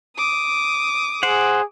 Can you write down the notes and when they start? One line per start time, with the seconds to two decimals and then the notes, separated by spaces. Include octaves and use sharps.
0.16 D6 D#6
1.23 G#4 C5 F#5